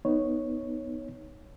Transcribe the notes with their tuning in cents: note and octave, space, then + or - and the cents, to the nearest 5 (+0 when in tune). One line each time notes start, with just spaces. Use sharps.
B3 +0 D#4 +0 C#5 +0